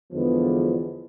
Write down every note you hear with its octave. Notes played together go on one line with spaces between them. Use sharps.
E2 D3 F3 G#3 B3